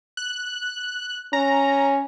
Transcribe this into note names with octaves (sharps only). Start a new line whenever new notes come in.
F#6
C#4 A#5